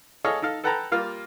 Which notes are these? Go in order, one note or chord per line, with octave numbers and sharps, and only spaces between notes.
G#4 A4 C#5 D#5 F5
D#4 A4 F5
A4 B4 F#5 G5 A5 A#5
G3 A#3 F4 F5